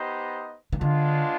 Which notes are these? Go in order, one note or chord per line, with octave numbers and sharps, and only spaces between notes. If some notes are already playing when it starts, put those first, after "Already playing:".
Already playing: B3 D#4 G4 C5 D#5
D#3
D3 G#3 B3 D4 F4